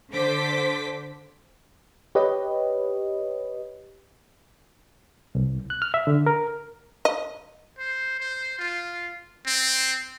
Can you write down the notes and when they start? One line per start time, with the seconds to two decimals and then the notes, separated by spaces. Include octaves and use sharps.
0.14 D3 C5 D6 B6
2.15 G4 B4 C#5 D#5
5.35 C2
5.70 F#6
5.82 F6
5.94 E5
6.07 D3
6.26 A#4
7.05 D#5
7.79 C5
8.20 C5
8.59 F4
9.46 C4